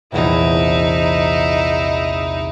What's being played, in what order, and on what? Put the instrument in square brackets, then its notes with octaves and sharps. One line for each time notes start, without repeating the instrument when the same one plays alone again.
[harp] A#1 E2 C3 [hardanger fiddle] D#4 E4